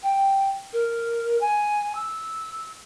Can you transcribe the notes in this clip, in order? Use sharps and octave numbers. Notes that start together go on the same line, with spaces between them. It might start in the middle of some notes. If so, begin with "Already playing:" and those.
G5
A#4
G#5
E6